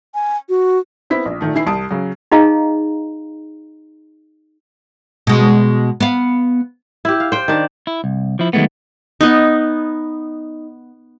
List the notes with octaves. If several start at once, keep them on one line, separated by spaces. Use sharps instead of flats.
G#5
F#4
B3 C4 E4 B6
A#1
A#2 D#3 A3
D#3 E3 E4 B5 C7
C2 A5 D#6 D7
C#3 F#3
D#4 G#4 D#5 F5 A#5
B2 G#3
B3 F5
E4 G4
F5
C5 G5
D#3 D4
E4
C2
F3 E4
D#3 F#3 G#3 A3 B3
B3 D#4